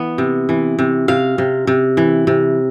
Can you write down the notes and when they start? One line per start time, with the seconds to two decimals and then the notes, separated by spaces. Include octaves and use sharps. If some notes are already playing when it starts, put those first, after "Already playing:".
Already playing: E3 B3
0.18 C3
0.49 E3
0.79 C3
1.08 C3 F5
1.38 C3
1.67 C3
1.97 E3
2.27 C3